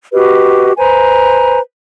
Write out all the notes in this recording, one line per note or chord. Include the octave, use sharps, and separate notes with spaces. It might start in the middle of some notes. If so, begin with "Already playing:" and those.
F#4 G4 B4 D#5
B4 C5 G#5 A#5